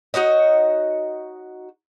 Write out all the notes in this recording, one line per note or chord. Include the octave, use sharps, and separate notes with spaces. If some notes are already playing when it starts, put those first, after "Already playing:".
D#4 F#4 C#5 D#5